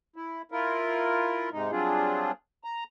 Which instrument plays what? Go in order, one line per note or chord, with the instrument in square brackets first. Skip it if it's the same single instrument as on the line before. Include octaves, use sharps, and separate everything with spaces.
[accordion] E4
E4 F4 A#4
G#2 C3 G#3 D#4
F#3 G3 C4 D4 F4 G#4
A#5